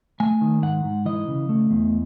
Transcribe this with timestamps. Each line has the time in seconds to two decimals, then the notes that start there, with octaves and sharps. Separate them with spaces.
0.20 A3 G#5
0.41 D#3
0.62 G#2 F#5
0.84 G#2
1.05 E3 D#5
1.28 C#3
1.49 A3
1.71 E2